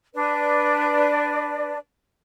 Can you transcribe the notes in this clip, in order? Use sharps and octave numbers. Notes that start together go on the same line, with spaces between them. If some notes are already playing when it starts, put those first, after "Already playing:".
D4 B4 D5